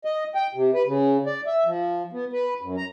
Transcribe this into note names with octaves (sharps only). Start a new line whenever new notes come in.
D#5
G5
C3
B4
C#3
D5
E5
F3
B3
B4
F#2
A#5